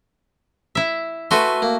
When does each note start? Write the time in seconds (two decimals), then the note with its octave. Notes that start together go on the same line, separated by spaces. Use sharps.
0.75 E4 E5
1.31 A3 F#4 B4 G#5 C6
1.62 A#3